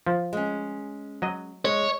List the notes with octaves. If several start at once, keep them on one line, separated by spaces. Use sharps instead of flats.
F3
G#3 C#4
F#3 D#5
G#3 C#5